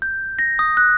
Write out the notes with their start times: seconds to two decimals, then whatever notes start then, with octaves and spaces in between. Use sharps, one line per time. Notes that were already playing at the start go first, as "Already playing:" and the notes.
0.02 G6
0.39 A#6
0.59 D#6
0.77 F#6